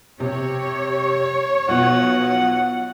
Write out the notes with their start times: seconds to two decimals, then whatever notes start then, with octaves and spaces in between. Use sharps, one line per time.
0.20 C3 G4 C#5
1.68 B1 B2 F3 F#5